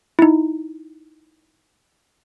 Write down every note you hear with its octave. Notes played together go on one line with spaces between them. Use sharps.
D#4 E4